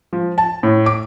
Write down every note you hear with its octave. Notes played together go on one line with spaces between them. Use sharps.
F3
A5
A2
D6